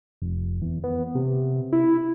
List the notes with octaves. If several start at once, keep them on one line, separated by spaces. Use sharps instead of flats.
F1
E2
B3
C3
E4